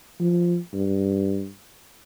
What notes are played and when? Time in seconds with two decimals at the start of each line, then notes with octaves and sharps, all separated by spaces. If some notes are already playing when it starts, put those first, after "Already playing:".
0.20 F3
0.74 G2